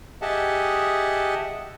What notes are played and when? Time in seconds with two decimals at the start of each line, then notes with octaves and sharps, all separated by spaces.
0.22 G4 G#4 D#5 E5 F#5 A5